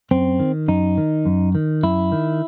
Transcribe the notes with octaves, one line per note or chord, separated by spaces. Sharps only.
F#2 C4
D#3
F#2 D#4
D#3
F#2
D#3
F#2 E4
D#3